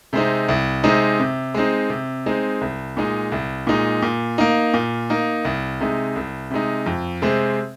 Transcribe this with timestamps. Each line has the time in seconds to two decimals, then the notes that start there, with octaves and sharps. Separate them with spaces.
0.13 C3 G#3 C4 D#4
0.48 C2
0.84 C3 G#3 C4 D#4
1.20 C3
1.54 G#3 C4 D#4
1.89 C3
2.26 G#3 C4 D#4
2.61 C2
2.97 A#2 G#3 D#4
3.32 C2
3.67 A#2 G#3 D#4
4.02 A#2
4.38 A#3 D#4
4.74 A#2
5.10 A#3 D#4
5.45 C2
5.80 C3 G#3 D#4
6.16 C2
6.51 C3 G#3 D#4
6.86 F2
7.22 C3 G#3 C4